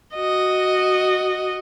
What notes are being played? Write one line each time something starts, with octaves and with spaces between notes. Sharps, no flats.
F#4 D#5